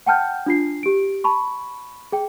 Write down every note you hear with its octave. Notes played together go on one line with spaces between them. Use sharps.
F#5 G5 A5 F6 G6
D4 F4 C7
G4 D7
A5 B5 C#6
G#4 G5